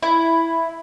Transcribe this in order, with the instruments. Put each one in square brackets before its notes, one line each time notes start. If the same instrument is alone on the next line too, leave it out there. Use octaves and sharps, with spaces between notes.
[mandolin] E4